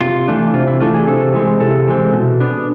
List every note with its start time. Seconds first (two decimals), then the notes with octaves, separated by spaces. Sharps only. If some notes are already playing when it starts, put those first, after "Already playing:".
0.01 C3 F4
0.28 E3 A3 D4
0.54 C3 F4
0.68 E4
0.80 E3 A3 D4 F4
0.94 G#4
1.07 C3 A4
1.34 E3 G#3 C4
1.60 C3 A4
1.88 E3 G#3 C4
2.13 B2
2.40 B3 D4